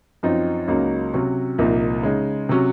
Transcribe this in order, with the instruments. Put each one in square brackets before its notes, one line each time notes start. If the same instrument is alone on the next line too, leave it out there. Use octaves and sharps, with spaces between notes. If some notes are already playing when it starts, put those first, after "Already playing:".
[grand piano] F#2 F3 C4 D#4
C#2 C#3 F#3 A#3 D#4
C3 F#3 C#4
C2 A#2 F3 A#3 D#4
C#3 G#3 D#4
C3 F#3 C#4